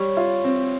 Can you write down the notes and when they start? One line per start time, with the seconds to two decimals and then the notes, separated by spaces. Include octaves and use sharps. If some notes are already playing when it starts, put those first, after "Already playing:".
Already playing: G3 C#5
0.17 F4
0.44 C4